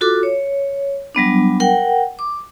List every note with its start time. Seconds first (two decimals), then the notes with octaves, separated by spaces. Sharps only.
0.01 F4 F#4 A4 D6
0.23 C#5
1.15 F#3 G3 B3 D4
1.60 A#4 F#5 G5
2.19 D6